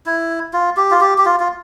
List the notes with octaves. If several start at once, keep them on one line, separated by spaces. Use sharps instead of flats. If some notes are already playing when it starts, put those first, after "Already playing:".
E4
F4
G4
F4
G4
G4
F4
F4